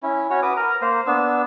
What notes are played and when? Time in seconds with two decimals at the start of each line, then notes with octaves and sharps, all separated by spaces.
0.03 C#4 E4
0.30 C#4 F#4 C#5
0.42 F#4 B4 D6 D#6
0.57 A#4 A#5
0.82 A#3 C5
1.07 B3 D4 E6